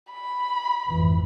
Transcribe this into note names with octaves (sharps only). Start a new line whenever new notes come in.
B5
G#1 F2 E3